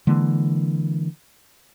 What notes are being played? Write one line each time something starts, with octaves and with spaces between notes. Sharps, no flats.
D3 E3 G#3 A#3